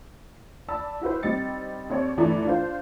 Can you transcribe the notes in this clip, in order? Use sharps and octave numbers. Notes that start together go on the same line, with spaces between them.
D5 A5 B5 E6
E4 F#4 B4 C5
G3 C4 D#4 A6 C#7
D#2 C4 C#5 D5
G1 D3 E3 A3 D5 A#5
D4 F4 C5